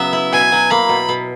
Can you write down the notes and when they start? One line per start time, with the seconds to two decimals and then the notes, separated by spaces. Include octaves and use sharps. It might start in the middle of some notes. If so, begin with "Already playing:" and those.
Already playing: C#3 F#3 B3 E5
0.13 E4
0.32 B2 G#5
0.52 F#3
0.70 A#3 B5
0.89 B2
1.09 B2